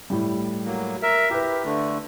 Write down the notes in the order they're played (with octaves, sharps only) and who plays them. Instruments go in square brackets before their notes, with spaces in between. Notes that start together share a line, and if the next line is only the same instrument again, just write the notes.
[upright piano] A2 G3
[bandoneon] F#3 A#3
A#4 E5
[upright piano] E4 B4 [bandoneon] G4
[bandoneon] D3 A3